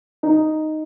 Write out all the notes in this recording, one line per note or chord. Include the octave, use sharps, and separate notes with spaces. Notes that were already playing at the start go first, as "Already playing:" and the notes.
D#4